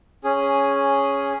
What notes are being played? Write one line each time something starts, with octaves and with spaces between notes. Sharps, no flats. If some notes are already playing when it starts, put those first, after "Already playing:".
C#4 G#4